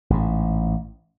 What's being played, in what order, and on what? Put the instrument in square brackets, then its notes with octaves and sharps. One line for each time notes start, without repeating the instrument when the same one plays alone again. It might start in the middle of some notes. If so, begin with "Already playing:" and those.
[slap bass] A1 G#2